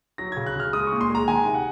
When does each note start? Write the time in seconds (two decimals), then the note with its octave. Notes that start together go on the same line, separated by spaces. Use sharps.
0.18 F#3 A#6
0.32 C#3 G#6
0.46 F#6
0.56 C#3 F6
0.73 G#3 D#6
0.87 C#6
0.92 A#2
1.01 C6
1.10 G#3 A#5
1.28 D#3 G#5
1.46 C3
1.54 F#5